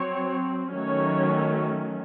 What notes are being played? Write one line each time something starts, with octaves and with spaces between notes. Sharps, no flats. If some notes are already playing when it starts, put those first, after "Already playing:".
Already playing: F#3 C4 C#5
D#3 F#3 A3 C#4 C#5